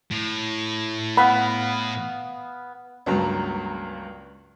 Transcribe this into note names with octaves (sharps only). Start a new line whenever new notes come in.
A2
B3 F5 B5
C#2 G2 F#3 A#3 A5 A#5